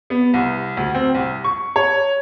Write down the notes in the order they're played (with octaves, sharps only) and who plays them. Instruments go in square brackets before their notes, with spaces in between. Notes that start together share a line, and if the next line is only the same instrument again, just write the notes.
[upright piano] B3
C2
D2
C4
C2
C#6
C#5